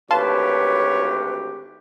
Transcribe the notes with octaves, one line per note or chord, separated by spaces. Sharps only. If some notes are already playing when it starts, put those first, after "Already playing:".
G#1 D2 G4 B4 C#5 F5 A5 C6